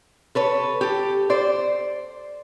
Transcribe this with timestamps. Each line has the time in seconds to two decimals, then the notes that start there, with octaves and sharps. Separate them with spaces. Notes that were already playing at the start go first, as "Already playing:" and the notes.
0.35 A4 B4 C#5
0.81 G4 A4
1.30 C5 D5